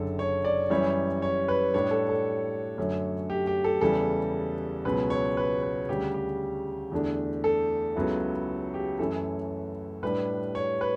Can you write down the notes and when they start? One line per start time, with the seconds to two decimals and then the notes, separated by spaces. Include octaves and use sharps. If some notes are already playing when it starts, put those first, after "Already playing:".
Already playing: F#1 F#2 D3 A4
0.19 C#5
0.45 D5
0.70 F#2 E3 G3 C#4 C#5
1.22 C#5
1.48 B4
1.74 A2 G3 D4 C#5
1.91 A4
2.09 A4
2.78 F#2 D3 F#3 A3 C#4
3.30 G4
3.47 G4
3.64 A4
3.81 E2 C#3 E3 G3 A4
4.85 C#2 B2 F#3 C#4 B4
5.10 C#5
5.37 B4
5.62 B4
5.89 D2 C#3 G3 G4
6.14 G4
6.92 E2 D3 A3 D4
7.44 A4
7.96 C#2 C#3 F#3 B3 E4
8.74 G4
8.99 F#2 E3 A3 C#4 E4 A4
10.03 A2 G3 D4 B4
10.55 C#5
10.81 B4